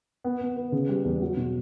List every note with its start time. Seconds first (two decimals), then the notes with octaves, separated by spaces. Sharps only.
0.24 B3
0.41 B3
0.56 B4
0.72 C#3
0.89 G3
1.05 E2
1.21 F#3
1.37 B2